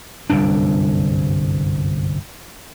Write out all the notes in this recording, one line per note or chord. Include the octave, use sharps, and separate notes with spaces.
G1 C2 F#2 D4